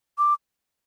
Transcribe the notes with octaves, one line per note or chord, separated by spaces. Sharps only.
D6